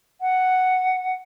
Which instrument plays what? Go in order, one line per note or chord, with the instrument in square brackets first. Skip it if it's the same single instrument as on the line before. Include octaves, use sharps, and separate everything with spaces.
[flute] F#5